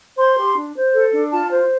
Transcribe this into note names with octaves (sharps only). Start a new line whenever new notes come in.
C5 C6
G4
D4
C5
A4
D4
F4 A5
C5